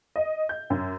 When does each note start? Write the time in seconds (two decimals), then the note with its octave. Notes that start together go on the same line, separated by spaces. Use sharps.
0.16 D#5
0.49 G6
0.70 F#2